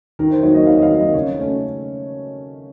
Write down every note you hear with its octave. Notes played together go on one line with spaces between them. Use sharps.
D#3 A#4
C5
F#3 A#3 D#4 C#5
D#5
D#3 F5
D#5
F5
F#3 A#3 D#4
D#5
C#3 C#5
A3 C#4